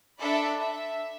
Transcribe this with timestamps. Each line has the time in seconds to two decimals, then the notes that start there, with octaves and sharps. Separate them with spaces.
0.19 D4 A4 D5 E5 B5
0.59 E5